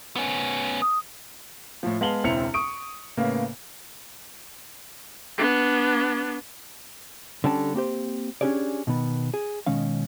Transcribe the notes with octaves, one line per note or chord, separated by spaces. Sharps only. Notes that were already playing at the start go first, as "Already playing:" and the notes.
B3 C#4
D#6
A2 F3
G#3 B3 F5 A5 F#7 G7
E1 C#2 C4 E4 C#7 F7
C#6 D#6 D7
A2 C#3 A#3 B3
B3 D4
D3 G3 C#4 G5 A5
A#3 C4 G4 C5
C#4 D4 G4 G#4 C#5 D5
B2 D#3 B3
G#4
B2 D#3 G#3 C#4 F5